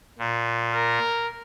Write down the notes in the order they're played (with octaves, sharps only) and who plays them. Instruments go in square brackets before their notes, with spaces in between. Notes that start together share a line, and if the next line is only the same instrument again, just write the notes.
[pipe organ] A#2
[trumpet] A#4